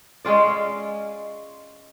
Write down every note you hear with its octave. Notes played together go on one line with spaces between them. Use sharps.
G#3 C#4 F4 D5